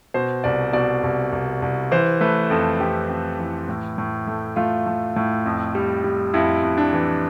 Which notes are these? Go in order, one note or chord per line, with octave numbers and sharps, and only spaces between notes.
B2 C5
C2 D5
B2 D5
C2
C2
C2
E3 C5
A3 B4
F2 A4
F2 G4
F2
E3
A2
A2
A3
A3 F4
A3
A2
F2
G3
G3
F2 E4
F2
D4
E3